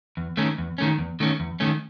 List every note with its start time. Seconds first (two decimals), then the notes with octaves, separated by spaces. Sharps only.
0.17 E2
0.37 D#3 A3 C#4
0.58 E2
0.78 D#3 A3 C#4
0.99 E2
1.20 D#3 A3 C#4
1.40 E2
1.60 D#3 A3 C#4